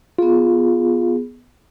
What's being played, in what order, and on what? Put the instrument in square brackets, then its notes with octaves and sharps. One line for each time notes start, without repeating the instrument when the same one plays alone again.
[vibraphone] B3 G#4 [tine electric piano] F4